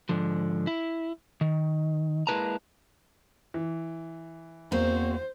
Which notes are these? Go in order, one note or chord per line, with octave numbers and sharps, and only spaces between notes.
G#2 D3 F3
E4
D#3
G#3 A#3 E4 B4 A5 A#5
E3
E2 A#3 C4 F#4 C5